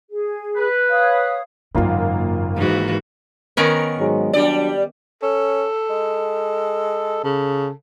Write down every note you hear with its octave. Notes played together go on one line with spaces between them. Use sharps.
G#4
B4
C#5 F5 D#6
G#1 F#2 C#3 A#3 F4
G#2 E3 F#4
D#3 B3 C#4 A#4
G#2 F#3 G#3
F#3 G3 D4 D5
C#4 A4
G#3
C#3 A4